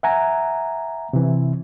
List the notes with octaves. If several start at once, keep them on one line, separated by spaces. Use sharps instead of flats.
E5 F#5 G#5 A#5
C3 E3